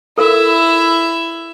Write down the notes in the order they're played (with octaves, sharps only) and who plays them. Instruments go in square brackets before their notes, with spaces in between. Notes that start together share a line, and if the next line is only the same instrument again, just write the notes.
[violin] E4 E5 [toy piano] A4 A#4